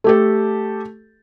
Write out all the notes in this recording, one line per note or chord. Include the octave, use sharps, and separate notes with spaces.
A3 G4 A4